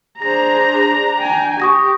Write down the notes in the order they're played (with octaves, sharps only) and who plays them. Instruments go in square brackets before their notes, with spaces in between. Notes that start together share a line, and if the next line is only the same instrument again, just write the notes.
[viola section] D4 A#5 [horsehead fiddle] G#4 C5 [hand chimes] A#6
[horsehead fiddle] G5 G#5
[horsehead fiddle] G4 [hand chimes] C#6 D#6 A#6